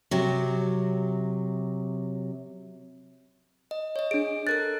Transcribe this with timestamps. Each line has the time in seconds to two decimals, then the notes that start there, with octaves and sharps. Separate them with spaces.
0.11 C3 F#3
3.71 D#5
3.96 C#5 D#5
4.11 D4 G#4 D7
4.47 A4 A#4 F#6 A6